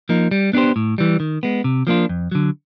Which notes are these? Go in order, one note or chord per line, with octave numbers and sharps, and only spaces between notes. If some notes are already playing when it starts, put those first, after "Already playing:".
F3 A#3 D#4
G3
B3 D4 G4 C5
A2
E3 G3
D#3
G#3 B3
C3
F3 A#3 D4 F4
F2
D3 F#3